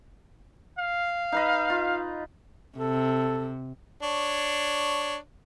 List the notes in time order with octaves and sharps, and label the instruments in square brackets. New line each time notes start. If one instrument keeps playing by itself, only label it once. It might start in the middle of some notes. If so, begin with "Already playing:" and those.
[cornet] F5
[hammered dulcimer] D#4 B4 D#5
F4
[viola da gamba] C3 [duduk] A4
[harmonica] D4 C#5